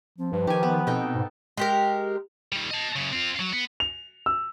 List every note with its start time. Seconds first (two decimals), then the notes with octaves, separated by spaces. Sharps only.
0.18 F3 C4
0.33 G2 B4
0.47 D#3 G4 G#5
0.63 B3
0.87 B2 C4 D#4 A4 G5
1.15 G#2
1.57 G#3 G4 A#4
2.52 D#3 G3
2.71 D#5 A5
2.96 F#2 C#3
3.13 C4 F4
3.40 F#3
3.53 B3
3.80 F7
4.26 E6